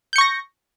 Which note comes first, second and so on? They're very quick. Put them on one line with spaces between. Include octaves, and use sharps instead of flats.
G6 C#7 C#6 A#6